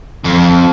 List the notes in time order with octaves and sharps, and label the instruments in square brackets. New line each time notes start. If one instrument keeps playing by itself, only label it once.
[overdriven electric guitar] F2